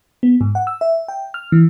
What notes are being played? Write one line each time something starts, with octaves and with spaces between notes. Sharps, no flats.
B3
G#2
F#5
E6
E5
G5
F6
E3